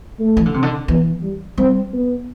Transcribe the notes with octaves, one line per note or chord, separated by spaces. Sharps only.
A3
E3
D3
C3
D3
E3 B3
G3
G3 C4
B3